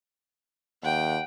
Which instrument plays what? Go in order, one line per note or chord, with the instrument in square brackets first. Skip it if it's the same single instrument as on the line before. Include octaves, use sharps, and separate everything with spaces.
[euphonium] D#2 [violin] F#5 G5